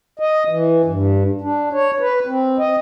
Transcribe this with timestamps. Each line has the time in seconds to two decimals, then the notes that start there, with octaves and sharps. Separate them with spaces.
0.19 D#5
0.49 E3
0.86 G2
1.41 D4
1.73 C#5
2.00 B4
2.26 C4
2.59 D#5